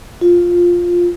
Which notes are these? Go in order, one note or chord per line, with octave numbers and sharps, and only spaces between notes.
F4